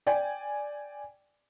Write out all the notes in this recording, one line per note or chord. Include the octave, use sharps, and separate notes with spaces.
D5 G5 G#5